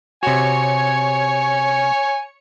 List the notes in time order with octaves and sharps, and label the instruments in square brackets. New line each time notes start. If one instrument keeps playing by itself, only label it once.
[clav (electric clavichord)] C3 F#4 [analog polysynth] C#5 C#7 [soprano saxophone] G#5